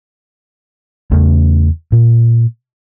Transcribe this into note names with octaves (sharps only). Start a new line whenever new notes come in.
E2 C#3 A3
A#2